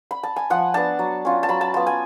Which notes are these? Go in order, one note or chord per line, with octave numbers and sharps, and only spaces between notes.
B5
A5
G#5
F3 F#5
B3 D4 A5
F#3
C#4 F4
A5
F#3 B5
A5
B3 F4 A5
G#5